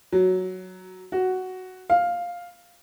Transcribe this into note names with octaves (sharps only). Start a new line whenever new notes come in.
F#3
F#4
F5